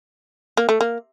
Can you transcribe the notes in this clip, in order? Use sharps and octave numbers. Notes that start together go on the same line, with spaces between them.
A#3
A3
A#3